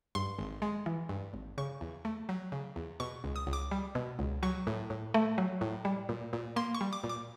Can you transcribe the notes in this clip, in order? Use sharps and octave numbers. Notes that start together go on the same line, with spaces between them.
G2 C6
G#1
G#3
E3
G2
G#1
C#3 C#6
E2
A3
F#3
C#3
E2
B2 C#6
C#2
D#6
C#2
D6
G3
B2
C#2
F#3 C#6
A2
A2
A3
F#3
A2
G3
A#2
A#2
A#3 C6
C#6
G3
D6
A#2
D6